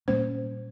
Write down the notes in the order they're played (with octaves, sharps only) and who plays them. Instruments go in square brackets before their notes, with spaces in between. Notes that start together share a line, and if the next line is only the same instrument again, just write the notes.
[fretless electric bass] A#2 G3 A#3 C#4 [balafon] C5